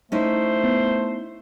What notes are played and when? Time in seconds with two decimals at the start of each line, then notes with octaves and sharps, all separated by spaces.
0.12 A3 C#4 D#4 E4 C5
0.64 B3